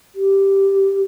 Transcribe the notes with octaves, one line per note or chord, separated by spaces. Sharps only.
G4